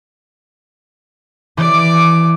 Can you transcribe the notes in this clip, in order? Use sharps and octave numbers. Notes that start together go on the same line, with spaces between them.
E3 D5 D6